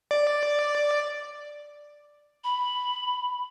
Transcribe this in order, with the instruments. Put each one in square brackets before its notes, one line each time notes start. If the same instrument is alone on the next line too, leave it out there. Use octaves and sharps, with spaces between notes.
[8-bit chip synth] D5
[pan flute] B5